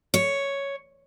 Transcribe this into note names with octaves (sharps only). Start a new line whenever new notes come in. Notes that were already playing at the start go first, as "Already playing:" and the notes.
C#5